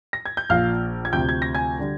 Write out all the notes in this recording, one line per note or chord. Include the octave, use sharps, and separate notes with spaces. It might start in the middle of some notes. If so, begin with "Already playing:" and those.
A#6
G#6
G6
A#1 A#2 F3 F5 F6
G#6
D2 C3 F3 G5 G6
G#6
A#6
G#5 G#6
D3 G3